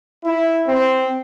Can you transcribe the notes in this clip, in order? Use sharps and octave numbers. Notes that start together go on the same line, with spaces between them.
E4
C4